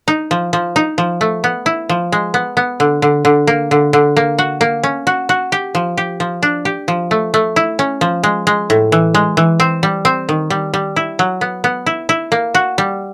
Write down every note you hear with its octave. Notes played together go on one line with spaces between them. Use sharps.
D#4
F3
F3
D#4
F3
A3
B3
E4
F3
G#3
B3
B3
D3
D3
D3
A#3
D3
D3
A#3
F#4
A#3
C#4
F#4
F#4
G4
F3
G4
F3
D4
G4
F3
A3
A3
E4
C#4
F3
G#3
G#3
A2
E3
G#3
E3
C4
G3
C4
D#3
G3
G3
E4
F#3
B3
B3
E4
E4
A#3
F#4
G3